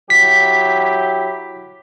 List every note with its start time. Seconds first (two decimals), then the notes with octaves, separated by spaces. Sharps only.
0.10 F#3 E4 G4 B6